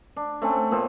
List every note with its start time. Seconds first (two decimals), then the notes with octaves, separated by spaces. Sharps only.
0.16 D4
0.42 A3 C4 C#4
0.71 A#2 B3 C4 C#5